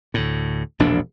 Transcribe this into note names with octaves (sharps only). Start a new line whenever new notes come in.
D2 A2
E1 A#1 E2 D4